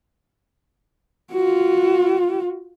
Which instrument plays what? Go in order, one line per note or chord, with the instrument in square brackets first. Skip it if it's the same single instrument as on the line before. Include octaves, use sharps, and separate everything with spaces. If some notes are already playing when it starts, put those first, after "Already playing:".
[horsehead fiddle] F4 F#4